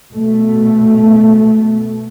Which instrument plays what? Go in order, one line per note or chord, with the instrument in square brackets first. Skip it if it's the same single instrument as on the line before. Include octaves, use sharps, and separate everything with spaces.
[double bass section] B2 A3